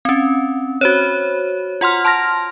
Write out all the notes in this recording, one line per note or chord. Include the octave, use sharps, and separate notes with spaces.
C4 C#4
F#4 C5 C#5
F4 F#5 C6 F6
A5 C6 F6 A#6